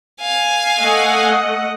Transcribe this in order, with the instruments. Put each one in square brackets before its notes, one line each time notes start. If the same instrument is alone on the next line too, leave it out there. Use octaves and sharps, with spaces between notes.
[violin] F5 G#5
[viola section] A3 D#5 F#5